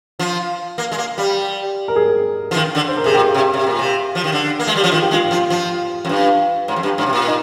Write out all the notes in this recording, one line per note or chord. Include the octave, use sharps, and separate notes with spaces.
F3
A#3
G#3
A#3
G3
A#4
G#4
F3
D#3
D3
C5
A#4
C3 G#4
A#2 G4
C3
C3
A#2
C3
F3
D#3
D3
A#3
G#3
G3
F3
D#3 F4
G4
G#3
F4
F3
F3
F2
G2
G#2
F2
G2
G#2
C3
A#2
D#4